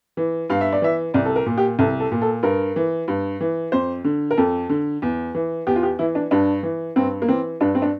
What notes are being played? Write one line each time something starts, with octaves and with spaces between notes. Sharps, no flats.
E3
G2 F5
E5
D5
E3 E5
C2 D5
A4
A#4
A#2
G4
C2 A4
A4
A#2
A4
G2 A#4
E3
G2
E3
F2 C5
D3
A#4
F2 A4
D3
E2
E3
E2 G4
F4
G4
E3 E4
D4
G2 D4
E3
G2 C4
A#3
E3 C4
G2 D4
C4
D4